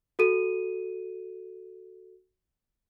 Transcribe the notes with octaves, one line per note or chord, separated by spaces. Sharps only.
F#4 A4 D#7